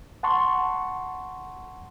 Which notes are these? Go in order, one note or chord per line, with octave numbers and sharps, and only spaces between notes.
F#5 A5 C6 C#6